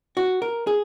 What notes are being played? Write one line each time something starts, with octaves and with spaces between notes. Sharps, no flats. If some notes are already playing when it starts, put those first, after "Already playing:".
F#4
A#4
G#4